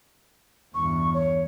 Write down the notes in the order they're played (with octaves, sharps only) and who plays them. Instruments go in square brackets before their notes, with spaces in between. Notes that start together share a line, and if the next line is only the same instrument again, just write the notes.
[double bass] E2 G2 [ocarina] C#6
[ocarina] C#5